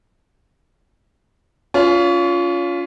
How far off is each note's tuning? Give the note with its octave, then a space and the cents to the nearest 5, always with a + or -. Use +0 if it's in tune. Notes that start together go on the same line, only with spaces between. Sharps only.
C#4 +35 F4 +0